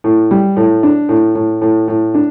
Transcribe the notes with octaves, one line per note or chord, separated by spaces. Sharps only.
A2
G3
A2
D4
A2
A2
A2
A2
D4